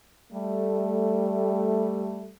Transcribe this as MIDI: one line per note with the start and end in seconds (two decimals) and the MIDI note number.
0.33 2.33 55
0.33 2.33 57